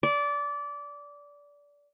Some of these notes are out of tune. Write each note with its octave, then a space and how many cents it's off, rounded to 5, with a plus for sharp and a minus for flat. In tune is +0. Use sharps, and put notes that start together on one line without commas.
D5 -20